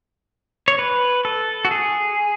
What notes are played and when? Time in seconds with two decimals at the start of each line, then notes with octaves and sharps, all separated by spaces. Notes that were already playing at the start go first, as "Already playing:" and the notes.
0.68 C#5
0.79 B4
1.25 A4
1.65 F#4
1.71 G#4